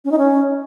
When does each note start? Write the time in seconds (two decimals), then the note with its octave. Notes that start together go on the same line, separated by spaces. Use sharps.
0.05 C#4
0.11 D#4
0.18 C#4